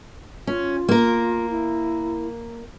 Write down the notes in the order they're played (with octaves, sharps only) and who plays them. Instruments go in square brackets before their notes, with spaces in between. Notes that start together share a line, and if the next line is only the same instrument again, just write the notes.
[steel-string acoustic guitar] C#4 [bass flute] F4
[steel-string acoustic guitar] A#3 A#4
[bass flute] E4